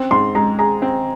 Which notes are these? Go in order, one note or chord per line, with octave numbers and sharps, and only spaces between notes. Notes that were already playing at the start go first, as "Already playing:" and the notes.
Already playing: C4
G#2 C6
G#3 A#5
G#4 A#5
C4